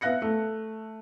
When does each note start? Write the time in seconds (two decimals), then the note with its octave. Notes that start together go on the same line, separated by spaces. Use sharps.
0.01 B3 E5 F5 F#6 A#6 C#7
0.22 A3